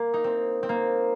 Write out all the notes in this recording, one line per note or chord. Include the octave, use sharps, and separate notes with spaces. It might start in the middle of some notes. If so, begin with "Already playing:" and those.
Already playing: A#3
D#4
C4
C4
A#3